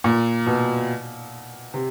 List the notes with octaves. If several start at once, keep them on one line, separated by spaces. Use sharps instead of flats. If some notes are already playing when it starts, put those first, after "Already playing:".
A#2
B2
C3